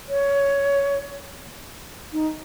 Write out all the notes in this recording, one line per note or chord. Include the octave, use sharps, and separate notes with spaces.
C#5
D#4